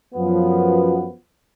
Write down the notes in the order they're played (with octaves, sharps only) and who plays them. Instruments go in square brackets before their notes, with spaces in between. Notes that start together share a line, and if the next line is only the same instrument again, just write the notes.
[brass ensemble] F#2 F3 B3